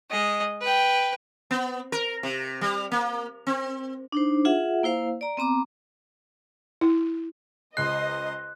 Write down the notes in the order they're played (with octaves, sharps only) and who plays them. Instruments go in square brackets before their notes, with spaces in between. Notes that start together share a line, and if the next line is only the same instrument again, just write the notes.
[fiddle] G#3 D#5
B4 G5
[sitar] B3
A#4
C3
G3
A#3
C4
[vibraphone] D4 D#4 C5
F4 G#4 E5 F#5
A#3 E4 C5 F5
D5 A#5
B3 C4 A#5 D6
[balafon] E4
[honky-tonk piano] C#2 C7 [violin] C5 C6 [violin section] D#5 [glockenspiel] F#6